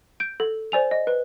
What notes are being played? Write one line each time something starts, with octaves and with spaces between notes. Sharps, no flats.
G6 D7
A4
C5 D5 G#5 F7
D#5
B4